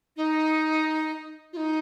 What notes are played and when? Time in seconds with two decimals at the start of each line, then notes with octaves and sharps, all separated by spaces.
0.17 D#4
1.53 F4
1.57 D#4